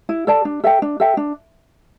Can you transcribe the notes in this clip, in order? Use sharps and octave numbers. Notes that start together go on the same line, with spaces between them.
E4
A4 D5 A5
D4
A4 E5 G5
D4
A4 E5 G5
D4